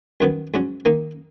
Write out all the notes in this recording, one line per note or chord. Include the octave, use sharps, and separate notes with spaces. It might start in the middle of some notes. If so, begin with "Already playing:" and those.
F#2 D#3 F#3 B3
G#2 F#3 C#4
D#3 A#3 D#4